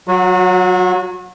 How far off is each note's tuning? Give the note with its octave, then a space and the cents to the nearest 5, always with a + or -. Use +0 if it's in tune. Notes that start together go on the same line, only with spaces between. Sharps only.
F#3 +0 F#4 -35